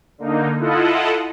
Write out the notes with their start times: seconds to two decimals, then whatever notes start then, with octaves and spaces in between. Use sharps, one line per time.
0.18 D3 A#3 D#4
0.59 E4 F4 A4 D#5 F#5